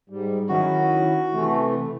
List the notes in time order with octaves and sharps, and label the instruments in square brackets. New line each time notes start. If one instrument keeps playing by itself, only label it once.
[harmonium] G#2 G3
[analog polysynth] D#3 F#3 [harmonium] C#4 E4 [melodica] F#4
[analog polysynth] C3 [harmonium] E3 A3